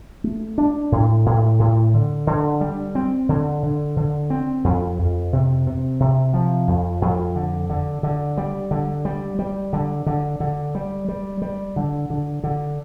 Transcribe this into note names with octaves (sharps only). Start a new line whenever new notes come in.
A3
D4
A2
A2
A2
D3
D3
G3
C4
D3
D3
D3
C4
F2
F2
C3
C3
C3
F3
F2
F2
D3
D3
D3
G3
D3
G3
G3
D3
D3
D3
G3
G3
G3
D3
D3
D3